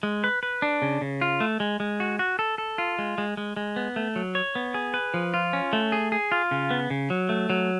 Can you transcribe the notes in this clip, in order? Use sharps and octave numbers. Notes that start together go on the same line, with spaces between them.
G#3
B4
B4
D4
C#3
C#3
F4
A3
G#3
G#3
F#4
F#4
A4
A4
F4
G#3
G#3
G#3
G#3
B3
A3
F#3
C#5
B3
G#4
B4
F3
F4
C#4
A3
G#4
G#4
F4
C#3
B3
C#3
F#3
A3
F#3